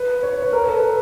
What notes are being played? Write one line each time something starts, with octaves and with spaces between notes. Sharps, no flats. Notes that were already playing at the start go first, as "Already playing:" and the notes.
Already playing: B4
C#5
C#5
B4
A#4
A4
B4